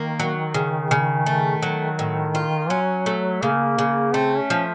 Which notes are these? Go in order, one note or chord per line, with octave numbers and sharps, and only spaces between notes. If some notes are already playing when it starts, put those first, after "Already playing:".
Already playing: D#3 A#3
F#3
C#3
C#3
D#3 A3
F#3
A2
F4
F#3 C#4
A3
C#3 A#3
C#3
A3 C4
C#4
F3